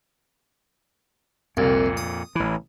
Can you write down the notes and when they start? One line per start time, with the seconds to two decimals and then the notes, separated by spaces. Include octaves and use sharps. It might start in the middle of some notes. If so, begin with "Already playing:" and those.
1.57 C2 F2 A#2
1.97 D#6
2.35 A1 E3